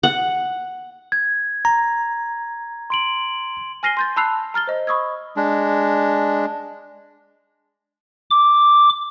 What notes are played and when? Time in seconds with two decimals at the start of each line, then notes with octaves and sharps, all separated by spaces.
0.03 F#5
1.12 G#6
1.65 A#5
2.90 C6 D7 F#7
3.83 G#5 F6 A#6 C7 D#7 G7
3.97 C6 G6 A6
4.16 A5 B5 E6 F#6 C7 F7
4.54 A#5 F6 A6 G7
4.67 C5 D#5
4.87 B5 C#6 D#6 E6 G#6
5.36 G#3 D4
8.31 D6